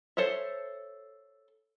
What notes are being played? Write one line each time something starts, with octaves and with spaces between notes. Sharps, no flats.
A4 C5 C#5 E5